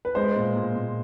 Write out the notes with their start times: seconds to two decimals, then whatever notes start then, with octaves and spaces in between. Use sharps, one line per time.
0.05 B4
0.15 G#3 C5
0.36 A#2
0.55 A#2
0.76 A#2